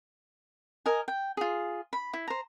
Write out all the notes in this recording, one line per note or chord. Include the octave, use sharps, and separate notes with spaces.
A#4 D#5 G#5
G5
F4 G#4
B5
E4
C5 A#5